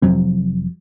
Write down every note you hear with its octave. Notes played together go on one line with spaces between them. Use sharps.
F1 F2 F#3 C4